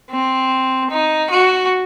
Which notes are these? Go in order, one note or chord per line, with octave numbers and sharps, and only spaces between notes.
C4
D#4
F#4